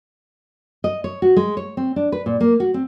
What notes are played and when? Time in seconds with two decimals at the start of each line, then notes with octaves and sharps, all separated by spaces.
0.84 D#5
1.04 C#5
1.22 F#4
1.37 G#3
1.57 C#5
1.77 C4
1.96 D4
2.12 B4
2.26 A#2
2.41 A#3
2.60 F#4
2.74 C4